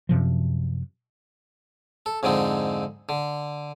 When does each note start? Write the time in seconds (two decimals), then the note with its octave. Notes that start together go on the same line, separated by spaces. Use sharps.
0.09 F#2 C3 F3
2.06 A4
2.23 F2 G#2 D3 C4 D#4
3.09 D3